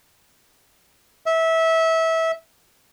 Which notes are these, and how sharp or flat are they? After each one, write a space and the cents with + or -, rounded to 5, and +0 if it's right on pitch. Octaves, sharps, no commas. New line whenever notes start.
E5 -20